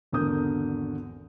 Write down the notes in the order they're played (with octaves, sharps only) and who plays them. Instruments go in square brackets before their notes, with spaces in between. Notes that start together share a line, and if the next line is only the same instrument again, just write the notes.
[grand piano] G#1 E2 D3 A#4 D#6 G6